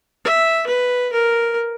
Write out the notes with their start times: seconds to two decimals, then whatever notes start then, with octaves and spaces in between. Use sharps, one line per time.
0.25 E5
0.67 B4
1.13 A#4